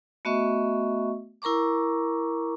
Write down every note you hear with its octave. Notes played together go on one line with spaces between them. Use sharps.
A3 B3 F#4 D#5 E5 C#6
E4 A#4 A#5 C#6 D6